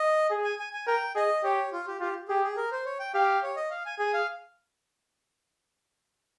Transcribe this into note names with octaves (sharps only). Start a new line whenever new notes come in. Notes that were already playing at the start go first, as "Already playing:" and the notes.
Already playing: D#5
G#4
G#5
G#5
G#5
A#4 G5
G#4 D#5
G4 C#5
F4
G4
F4 G4
G4 G#4
G#4
A#4
C5
C#5
G5
G4 F5
C#5
D#5
F5
G#5
G#4 G#5
F5